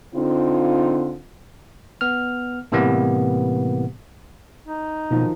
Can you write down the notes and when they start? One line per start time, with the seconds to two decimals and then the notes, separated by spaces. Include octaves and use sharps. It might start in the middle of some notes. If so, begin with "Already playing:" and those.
0.15 D3 C4 D#4 F4
2.01 B3 F6
2.72 A2 C3 E3 G3 A#3 B3
4.67 D#4
5.11 B2 D#3 F3 F#3